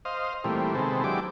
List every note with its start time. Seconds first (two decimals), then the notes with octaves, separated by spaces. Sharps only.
0.05 C5 D#5 F5
0.44 A#2 E3 G3 A3 C4
0.74 C3 D#3 G#3 B3 C4 A4
1.04 F#3 G#3 D4 E4 G4 D6